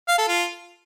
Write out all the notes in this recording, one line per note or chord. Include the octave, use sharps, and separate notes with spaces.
F5
A4
F4